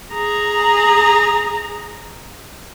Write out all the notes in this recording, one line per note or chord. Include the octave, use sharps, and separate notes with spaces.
G#4 A#5